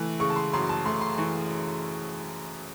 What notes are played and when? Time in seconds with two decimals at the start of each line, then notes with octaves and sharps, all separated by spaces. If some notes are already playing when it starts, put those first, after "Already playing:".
Already playing: E3 A3
0.20 C#3 C#6
0.30 A5
0.36 C6
0.53 F#2 C6
0.69 A5
0.86 A3 C6
1.01 C6
1.18 E3 C#6